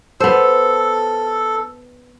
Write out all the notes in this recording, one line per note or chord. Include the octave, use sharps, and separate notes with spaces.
B3 A4 C5